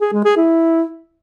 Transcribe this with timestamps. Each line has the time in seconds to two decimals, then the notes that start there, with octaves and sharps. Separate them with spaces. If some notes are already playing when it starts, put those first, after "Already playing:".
0.01 G#4
0.13 G#3
0.25 G#4
0.37 E4